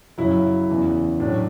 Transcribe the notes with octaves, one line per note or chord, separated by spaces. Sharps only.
F#2 C#3 F#3 E4
E2 C#3 E3
A2 F#3 D4